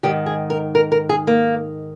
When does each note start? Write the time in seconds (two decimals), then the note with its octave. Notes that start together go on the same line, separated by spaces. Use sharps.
0.03 G#2 D#3 G4
0.26 G#4
0.50 A#4
0.75 A#4
0.92 A#4
1.09 G#4
1.27 A#3